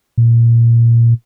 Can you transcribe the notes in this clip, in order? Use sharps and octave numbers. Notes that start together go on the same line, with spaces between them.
A#2